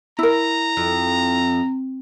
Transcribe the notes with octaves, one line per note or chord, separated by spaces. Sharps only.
E4 A#4 A#5
F2